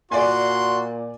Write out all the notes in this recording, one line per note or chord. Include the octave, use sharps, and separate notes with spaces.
A#2 F#4 D5 G#5 C6